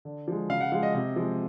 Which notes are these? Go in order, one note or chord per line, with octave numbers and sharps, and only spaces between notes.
D3
F3 G#3
C#3 F5
F#5
F3 G#3 F5
D#5
C3 D#5
F3 G#3